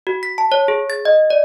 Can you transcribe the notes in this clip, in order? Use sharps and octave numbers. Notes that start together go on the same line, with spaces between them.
F#4
B6
A5
C#5
G#4
A6
D#5
D5